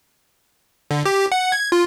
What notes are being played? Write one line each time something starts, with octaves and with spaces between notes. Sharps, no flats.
D3
G4
F#5
G#6
F4